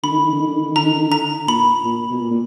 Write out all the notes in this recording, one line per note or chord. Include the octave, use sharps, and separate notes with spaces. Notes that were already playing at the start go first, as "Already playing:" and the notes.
D3 B5
D#3
D3
D#3
D3
D#3
D3
D#3
D3
D#3
D3 A#5
D#3
D3
D#3
D3 A#5
A#2 B5
A#2
B2
A#2
A#2